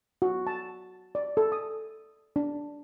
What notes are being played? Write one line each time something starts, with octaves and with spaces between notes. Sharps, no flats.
F#4
A5
D5
A4
D#6
D4